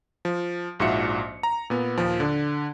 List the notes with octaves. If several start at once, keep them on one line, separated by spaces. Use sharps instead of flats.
F3
A#1 G#2 F4 F#4 E5 C#7
A#5
A#2 B3
D#2 A#2 F3
D3 D4